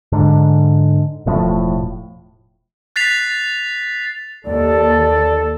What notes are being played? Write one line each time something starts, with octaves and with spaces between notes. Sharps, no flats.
G#2 D3
E1 A2 F3
F#6 A6 B6 C7 F7
D#2 A4 D5